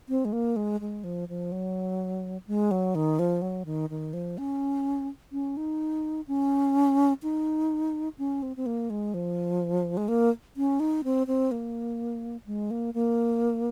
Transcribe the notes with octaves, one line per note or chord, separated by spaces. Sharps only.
C4
G#3
A#3
G#3
G#3
F3
F3
F#3
G#3
F#3
D#3
F3
F#3
D#3
D#3
F3
C#4
C#4
D#4
C#4
D#4
C#4
C4
C4
A#3
G#3
F3
G#3
A#3
C#4
D#4
C4
C4
A#3
G#3
A#3
A#3